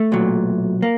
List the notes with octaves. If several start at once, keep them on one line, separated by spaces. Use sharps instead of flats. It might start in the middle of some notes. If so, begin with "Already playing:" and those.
Already playing: A3
B1 A#2 F#3
A#3